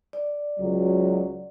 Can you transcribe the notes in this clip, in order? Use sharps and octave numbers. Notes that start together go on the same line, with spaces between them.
D5
C#2 F#3